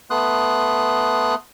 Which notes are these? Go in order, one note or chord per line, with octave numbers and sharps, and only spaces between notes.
A3 B3 C6 D#6 F#6